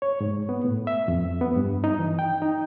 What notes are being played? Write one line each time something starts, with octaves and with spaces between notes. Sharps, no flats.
C#5
G#2
B3
A2
E5
F2
B3
G2
D#4
E3
G5
D#4